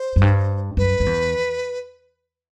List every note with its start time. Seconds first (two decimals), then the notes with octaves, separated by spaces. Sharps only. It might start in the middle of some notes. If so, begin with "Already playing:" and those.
Already playing: C5
0.16 F#2
0.22 G2
0.77 F#2 B4
1.00 F#2
1.06 E2